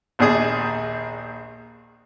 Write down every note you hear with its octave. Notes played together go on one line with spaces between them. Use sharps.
A#1 D#2 D4 G#4 D#6